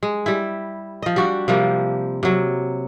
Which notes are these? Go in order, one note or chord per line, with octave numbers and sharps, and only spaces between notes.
G#3
G3 E4
F3 D#5
G3 D4 F#4
C3 F3 G3 A#3
C3 F#3